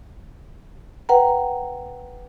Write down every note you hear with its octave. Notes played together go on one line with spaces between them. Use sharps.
B4 F#5 G5 A#5